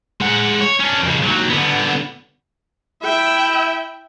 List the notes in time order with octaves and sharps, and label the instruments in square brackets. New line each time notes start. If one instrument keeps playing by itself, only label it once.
[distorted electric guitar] G#3 F#5
C#5
C#4 D4
F2 C#3
D#2 F#3
D3 B3
[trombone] E4 [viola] E5 G5